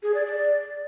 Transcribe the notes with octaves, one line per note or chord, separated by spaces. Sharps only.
G#4
D5
D5